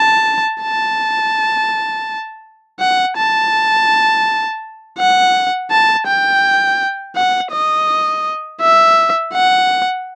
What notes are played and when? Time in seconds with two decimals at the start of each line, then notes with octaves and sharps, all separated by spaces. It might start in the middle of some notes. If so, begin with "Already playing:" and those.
Already playing: A5
0.62 A5
2.80 F#5
3.17 A5
4.98 F#5
5.71 A5
6.07 G5
7.15 F#5
7.52 D#5
8.61 E5
9.33 F#5